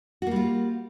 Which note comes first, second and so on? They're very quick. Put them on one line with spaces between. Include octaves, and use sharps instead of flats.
F#4 A#3 G3 F4